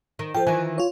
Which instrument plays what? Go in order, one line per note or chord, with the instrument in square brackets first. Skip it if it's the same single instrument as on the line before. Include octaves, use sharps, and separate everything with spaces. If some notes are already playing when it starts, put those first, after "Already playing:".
[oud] D#3
[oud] F3 [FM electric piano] A4 G5
[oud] D#3 E3 [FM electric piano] G#5
[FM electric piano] F4 C#5